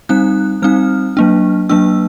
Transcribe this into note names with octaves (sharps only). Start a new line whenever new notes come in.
G3 C4 D#4 F#6
G3 C4 D#4 F6
F#3 A#3 D4
F#3 A#3 D4 E6